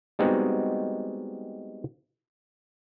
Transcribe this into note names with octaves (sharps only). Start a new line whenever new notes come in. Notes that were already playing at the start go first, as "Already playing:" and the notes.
G3 G#3 B3 C4 D#4 F#4